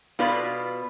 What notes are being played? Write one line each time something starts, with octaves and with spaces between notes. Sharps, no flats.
B2 B3 F4 B4 D5